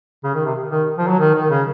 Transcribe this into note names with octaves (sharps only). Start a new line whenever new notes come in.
C#3
D#3
C3
D#3
F3
F#3
D#3
D#3
C#3